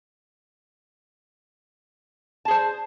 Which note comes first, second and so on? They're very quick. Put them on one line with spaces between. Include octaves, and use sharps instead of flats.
A5 G#4 C5